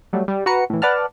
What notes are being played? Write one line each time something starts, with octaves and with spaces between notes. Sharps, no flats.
F#3 G3 A3
G3
F#4 B4 A#5 C#7
A2 E3
B4 D5 F#5 A5 F6